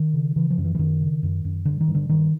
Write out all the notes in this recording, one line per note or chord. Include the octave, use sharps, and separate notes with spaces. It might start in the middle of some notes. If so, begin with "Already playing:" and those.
Already playing: D#3
C#3
C#3 E3
F3
F#2
E3
E3
F#2 D#3
C#3
F#2
F#2
G2 D3
D#3
G2
D3
G2 D#3